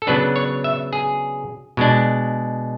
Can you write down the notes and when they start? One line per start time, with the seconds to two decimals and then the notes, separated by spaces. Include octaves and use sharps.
0.02 A4
0.07 C#3 F#3 B3 D4 B4
0.36 C#5
0.64 E5
0.93 G#4
1.77 B2 G#3 D4